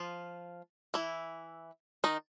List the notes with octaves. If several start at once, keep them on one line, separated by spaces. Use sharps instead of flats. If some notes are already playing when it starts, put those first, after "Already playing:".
Already playing: F3 F4
E3 E4
D#3 D#4